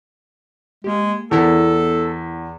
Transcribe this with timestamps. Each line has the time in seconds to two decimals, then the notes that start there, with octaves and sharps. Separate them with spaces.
0.84 G#3 A#3 G4
1.31 E2 B3 E4 A4 A#4